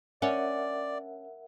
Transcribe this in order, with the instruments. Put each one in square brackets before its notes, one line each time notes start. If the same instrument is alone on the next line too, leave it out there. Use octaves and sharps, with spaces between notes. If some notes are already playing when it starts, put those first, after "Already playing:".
[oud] C#4 [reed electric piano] A#4 E5 F#5 [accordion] D5